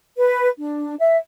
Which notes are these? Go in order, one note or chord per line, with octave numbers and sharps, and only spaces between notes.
B4
D4
E5